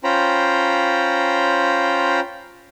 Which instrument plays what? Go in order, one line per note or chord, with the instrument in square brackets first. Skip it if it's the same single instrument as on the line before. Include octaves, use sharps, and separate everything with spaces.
[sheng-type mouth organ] C#4 F4 C5 G5 A#5 B5